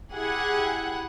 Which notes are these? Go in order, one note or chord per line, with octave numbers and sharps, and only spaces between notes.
E4 G4 G#4 F#5